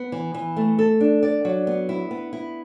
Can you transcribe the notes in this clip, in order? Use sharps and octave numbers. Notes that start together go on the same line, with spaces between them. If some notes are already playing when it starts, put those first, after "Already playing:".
Already playing: B3
E3
E3
A3
A4
D4
D5
F#3
B3
E4
B3
E4